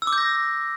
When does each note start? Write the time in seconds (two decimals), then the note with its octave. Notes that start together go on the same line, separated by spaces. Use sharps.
0.02 E6
0.07 D6
0.13 G6
0.18 A#6